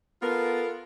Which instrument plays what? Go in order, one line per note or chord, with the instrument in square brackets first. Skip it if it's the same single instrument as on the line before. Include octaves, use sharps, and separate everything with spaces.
[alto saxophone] B3 [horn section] F4 A4 A#4